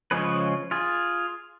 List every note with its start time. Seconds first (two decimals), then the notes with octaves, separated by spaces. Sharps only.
0.11 C#3 F3 G#3 C#4 G#4 B4
0.71 F4 G#4